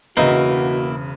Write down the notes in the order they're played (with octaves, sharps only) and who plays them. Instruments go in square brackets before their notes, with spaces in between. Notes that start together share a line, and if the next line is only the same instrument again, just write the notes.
[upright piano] E1 C#3 B4 [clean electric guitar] A#3 E4 [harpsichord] D#4 [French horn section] F#4